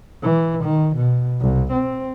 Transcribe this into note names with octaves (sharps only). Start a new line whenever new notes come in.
E3
D#3
B2
C2
C4